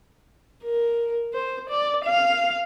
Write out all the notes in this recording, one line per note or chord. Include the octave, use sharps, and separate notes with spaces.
A#4
C5
D5
F5